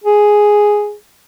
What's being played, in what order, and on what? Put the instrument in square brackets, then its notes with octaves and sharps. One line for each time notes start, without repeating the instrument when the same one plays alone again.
[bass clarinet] G#4